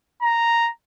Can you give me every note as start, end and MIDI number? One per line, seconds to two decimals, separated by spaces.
0.23 0.68 82